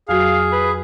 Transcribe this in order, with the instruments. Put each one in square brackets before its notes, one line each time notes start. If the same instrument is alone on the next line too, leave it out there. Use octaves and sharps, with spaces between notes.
[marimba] F2 F#3 F#4 [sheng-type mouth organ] G#4 [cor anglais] F5
[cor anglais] B4